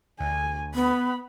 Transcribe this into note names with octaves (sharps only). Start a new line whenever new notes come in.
D2 G#5
B3 B5